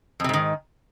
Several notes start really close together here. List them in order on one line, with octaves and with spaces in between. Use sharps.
F2 C3 G#2 D#3